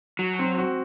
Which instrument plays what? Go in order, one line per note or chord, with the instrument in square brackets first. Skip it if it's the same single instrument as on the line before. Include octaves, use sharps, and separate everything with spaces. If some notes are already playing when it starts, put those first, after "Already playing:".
[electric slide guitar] F#3 [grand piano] F#4
[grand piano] C4
F#4